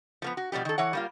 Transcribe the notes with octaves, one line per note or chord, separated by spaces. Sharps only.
F3 A#3 B3
F#4
B2 F3 G3 G4
D#3 A4
E3 C#5 F#5
G3 A#3 F4